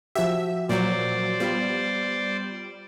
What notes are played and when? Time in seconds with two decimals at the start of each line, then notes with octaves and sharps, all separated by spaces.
0.15 F3 F#4 G4 E5
0.69 A#2 F#3 C5 D5
1.40 G3 B3 F4